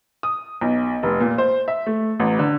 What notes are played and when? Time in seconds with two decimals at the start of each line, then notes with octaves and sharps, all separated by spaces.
0.23 D#6
0.61 B1
1.03 F1
1.20 A#2
1.38 C5
1.68 E5
1.86 A3
2.20 A1
2.39 D3